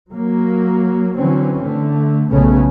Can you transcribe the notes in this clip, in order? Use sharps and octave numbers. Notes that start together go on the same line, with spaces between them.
F#3 A#3
D3 E3 F#3 C4 C#4
D3 A3
B1 A#2 C#3 A3 B3 C#4